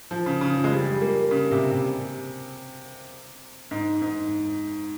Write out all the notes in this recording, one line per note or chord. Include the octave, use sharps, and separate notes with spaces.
F3
C#3
C#3
F3
G#3
G3
A#3
C#3
C3
C3
G#2
G#2